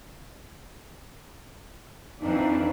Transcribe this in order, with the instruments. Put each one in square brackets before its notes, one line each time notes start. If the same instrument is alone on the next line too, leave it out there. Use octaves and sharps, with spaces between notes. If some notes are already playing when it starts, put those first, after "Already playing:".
[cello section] F2 E3 D4 [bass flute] D#4